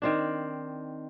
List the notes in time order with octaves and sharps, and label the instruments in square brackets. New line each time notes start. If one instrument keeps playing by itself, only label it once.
[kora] D#3 C4 D4